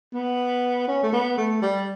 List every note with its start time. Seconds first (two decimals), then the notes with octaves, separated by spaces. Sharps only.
0.14 B3
0.88 C#4
1.03 A3
1.13 B3
1.37 A3
1.62 G3